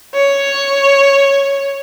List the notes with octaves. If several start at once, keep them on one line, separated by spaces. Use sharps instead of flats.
C#5